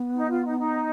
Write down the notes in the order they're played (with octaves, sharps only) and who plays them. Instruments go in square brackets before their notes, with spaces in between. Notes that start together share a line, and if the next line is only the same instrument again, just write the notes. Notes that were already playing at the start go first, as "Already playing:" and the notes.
Already playing: [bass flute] B3
[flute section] D#4
F4
D#4
D#4